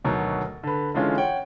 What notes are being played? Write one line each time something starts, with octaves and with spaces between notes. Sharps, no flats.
D2 B2 D#3 F#3
D3 B4
D3 E3 G#3 C#4 F4
C#5 F#5 G5